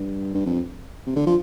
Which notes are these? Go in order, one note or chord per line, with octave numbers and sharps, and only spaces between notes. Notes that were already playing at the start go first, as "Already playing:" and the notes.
Already playing: G2
G2
F2
C3
D3
F3